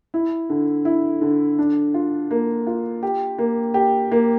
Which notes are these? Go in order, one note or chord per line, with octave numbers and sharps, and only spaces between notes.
E4
D3
E4
D3
D4
F4
A#3
F4
G4
A#3
G4
A#3